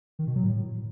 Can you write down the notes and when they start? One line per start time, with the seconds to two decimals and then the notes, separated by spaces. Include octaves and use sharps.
0.19 D#3
0.27 B2
0.35 F#3
0.44 A2